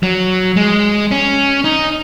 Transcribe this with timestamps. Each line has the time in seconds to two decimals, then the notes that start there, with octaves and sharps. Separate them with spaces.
0.03 F#3
0.57 G#3
1.11 C#4
1.64 D#4